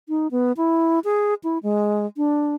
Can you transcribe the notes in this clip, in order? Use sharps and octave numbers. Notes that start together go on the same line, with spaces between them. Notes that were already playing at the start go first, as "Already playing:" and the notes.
D#4
B3
E4
G#4
E4
G#3
D4